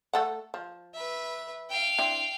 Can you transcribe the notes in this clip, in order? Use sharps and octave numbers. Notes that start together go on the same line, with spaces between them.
A3 A4 F#5
F3
B4 E5
F5 G5
C4 D4 E4